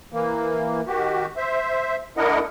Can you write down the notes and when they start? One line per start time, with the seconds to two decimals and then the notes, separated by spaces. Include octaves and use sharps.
0.12 E3 A#3
0.87 D#3 F#4 G4
1.37 C5 E5
2.17 A3 D4 E4 A#4 D#5 F#5